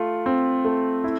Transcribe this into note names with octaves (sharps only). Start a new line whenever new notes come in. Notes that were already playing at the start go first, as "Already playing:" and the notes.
Already playing: A3 F4
C4
A3
E4